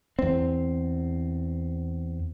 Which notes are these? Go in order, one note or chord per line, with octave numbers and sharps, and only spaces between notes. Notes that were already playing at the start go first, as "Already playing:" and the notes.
E2 C4